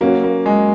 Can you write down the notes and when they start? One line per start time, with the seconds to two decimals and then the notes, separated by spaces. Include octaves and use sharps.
0.01 F#3 A#3 C#4 F#4
0.24 A#3
0.46 G#3